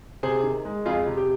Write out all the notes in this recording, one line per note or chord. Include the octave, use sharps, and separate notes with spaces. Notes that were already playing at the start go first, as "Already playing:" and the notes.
C3 G#4 C5
D#3
G#3
F2 F4 G#4
C3
G4